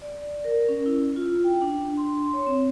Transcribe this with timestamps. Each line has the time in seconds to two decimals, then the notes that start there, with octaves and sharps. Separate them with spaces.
0.02 D5
0.44 A#4
0.69 C#4
0.86 E4
1.16 F4
1.44 G5
1.62 D4
1.97 C6
2.33 C#5
2.47 C4